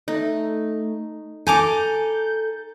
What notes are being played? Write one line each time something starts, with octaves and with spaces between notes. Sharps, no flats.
A3 D#4
A4 G#5 A#5 D6 G6